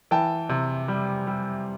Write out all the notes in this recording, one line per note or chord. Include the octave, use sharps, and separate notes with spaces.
E3 G5 A5
C3
G3
G3